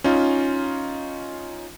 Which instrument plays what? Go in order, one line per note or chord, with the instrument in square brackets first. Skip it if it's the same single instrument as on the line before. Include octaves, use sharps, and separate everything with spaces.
[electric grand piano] C#4 D#4 F4